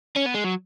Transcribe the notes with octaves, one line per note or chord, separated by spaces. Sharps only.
C#4
B3
G#3
F#3